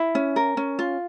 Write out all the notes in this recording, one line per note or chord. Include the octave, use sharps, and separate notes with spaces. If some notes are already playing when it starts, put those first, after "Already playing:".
Already playing: E4 E5
C#4
A#4
C#4
F4